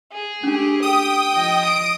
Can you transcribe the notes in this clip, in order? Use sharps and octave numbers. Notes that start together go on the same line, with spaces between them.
G#4
A3 C#4 D4 G4
G5 D#6
F3 D#5
D7